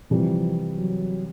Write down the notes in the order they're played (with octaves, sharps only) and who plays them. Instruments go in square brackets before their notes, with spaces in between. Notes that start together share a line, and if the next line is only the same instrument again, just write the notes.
[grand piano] C3 E3 G3 [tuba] F3
[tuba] F#3